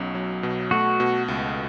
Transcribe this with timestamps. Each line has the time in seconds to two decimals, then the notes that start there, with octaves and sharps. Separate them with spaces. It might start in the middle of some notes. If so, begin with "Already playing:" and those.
Already playing: B1 B2 F#3 C#4
0.15 F#3
0.43 B2
0.71 A3 F#4
1.00 B2
1.28 C#2